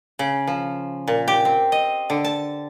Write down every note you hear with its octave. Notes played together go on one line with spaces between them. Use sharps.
C#3
F3
A#2
G4
C4
D#5
D3
A5